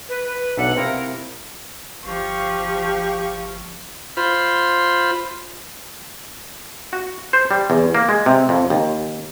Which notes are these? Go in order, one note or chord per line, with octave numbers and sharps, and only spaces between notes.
B4
B4
B1 D4 E5 F#5
C3 E4 A#4 F5
G1 F3 G3 G4 F5 C#6
F4 C5 B5
F#4
C5
G3
E2
A#3
G#3
C3
F2
D#2